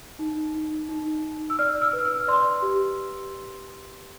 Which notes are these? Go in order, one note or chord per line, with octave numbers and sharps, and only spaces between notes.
D#4
D#4
D#4
D#4
E6
D5 F6
E6
B4
F6
E6
D5 C6
G4